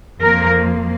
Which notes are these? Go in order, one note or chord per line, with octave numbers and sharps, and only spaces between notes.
F2 F3 A#3 A#4